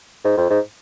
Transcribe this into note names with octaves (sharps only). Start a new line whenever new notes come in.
G#2
F2
G#2